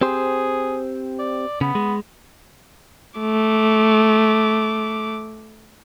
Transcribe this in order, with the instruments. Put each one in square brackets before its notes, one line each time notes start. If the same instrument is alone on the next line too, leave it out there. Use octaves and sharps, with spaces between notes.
[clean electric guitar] C4 G4 C5 [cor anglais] G#4
[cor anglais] D5
[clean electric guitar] C#3 [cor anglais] B3
[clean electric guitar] G#3
[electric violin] A3 D6